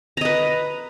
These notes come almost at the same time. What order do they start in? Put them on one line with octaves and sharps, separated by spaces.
A#5 D#5 B4